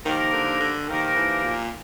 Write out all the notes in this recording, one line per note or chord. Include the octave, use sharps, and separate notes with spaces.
D#3 F3 A#3 D#4 G4 A#4
D3
D3
D#3 F3 A#3 D#4 G4 A#4
E3
A#2